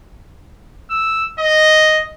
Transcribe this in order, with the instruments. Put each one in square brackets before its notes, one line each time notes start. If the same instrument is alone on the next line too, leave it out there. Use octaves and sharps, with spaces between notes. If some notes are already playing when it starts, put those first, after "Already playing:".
[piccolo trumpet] E6
D#5